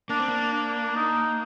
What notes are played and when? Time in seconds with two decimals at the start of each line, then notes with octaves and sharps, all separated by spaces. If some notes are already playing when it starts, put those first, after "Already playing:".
0.10 A#3 D4
0.19 C4
0.28 A#3
0.53 D4
0.96 D#4